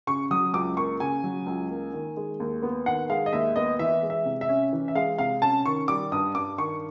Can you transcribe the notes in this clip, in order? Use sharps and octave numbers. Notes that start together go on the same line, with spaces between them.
C#3 C#6
F#3 D#6
C#2 D6
A#3 C#6
C#3 G#5
F#3
C#2
A#3
D#3
G#3
D#2
B3
D#3 F#5
G#3 F5
D#5
D#2 E5
B3 D#5
E3 E5
G#3
E5
C3
E5
C#4
E3
E5
G#3 F5
C3 F5
C#4 A5
D#3 C#6
G3 D6
G2 D#6
G2 D6
D#3 C#6